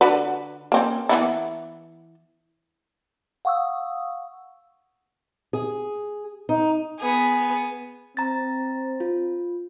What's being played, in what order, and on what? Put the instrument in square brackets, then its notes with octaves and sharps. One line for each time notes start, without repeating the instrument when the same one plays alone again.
[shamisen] D3 F#4 B4
A#3 C4 C#4
E3 B3 E4
[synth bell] F5 F#5 C#6 D#6 E6
[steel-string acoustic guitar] G#4
D#4
[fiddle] B3 G#4
[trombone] C4 [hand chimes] A#5 A6
[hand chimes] F4